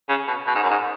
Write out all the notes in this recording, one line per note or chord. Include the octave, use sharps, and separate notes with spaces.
C#3
B2
B2
G#2
F#2
G#2